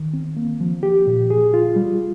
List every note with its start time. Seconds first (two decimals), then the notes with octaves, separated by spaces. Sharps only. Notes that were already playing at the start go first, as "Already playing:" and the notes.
Already playing: D#3
0.14 C4
0.37 A#3
0.60 F3
0.83 G4
1.07 A#2
1.30 G#4
1.54 F4
1.76 G3